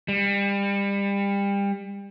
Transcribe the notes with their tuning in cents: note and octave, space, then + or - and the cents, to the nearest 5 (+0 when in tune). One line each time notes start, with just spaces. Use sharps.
G3 +30